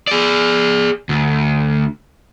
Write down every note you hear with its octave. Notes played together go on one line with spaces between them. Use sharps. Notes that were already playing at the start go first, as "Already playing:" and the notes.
G#4 D5
D2